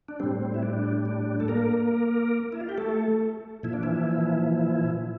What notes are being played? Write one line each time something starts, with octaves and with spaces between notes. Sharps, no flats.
D4
A2 G3 C4
E4
D4
D4
A4
A#3 A#4
E4
F4
G4
A3 A4
A#2 F3 E4
D4
E3 E4